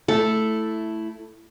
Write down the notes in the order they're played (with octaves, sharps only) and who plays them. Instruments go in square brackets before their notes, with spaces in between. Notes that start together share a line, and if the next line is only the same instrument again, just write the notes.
[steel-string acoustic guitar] A3 E4 [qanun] A4